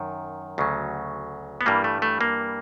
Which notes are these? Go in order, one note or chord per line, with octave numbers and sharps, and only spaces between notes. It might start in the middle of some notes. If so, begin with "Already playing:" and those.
Already playing: F#2 D#3
D2 C#3 F#3
B3
G2 E3 G3 A#3
A3
A3
A#3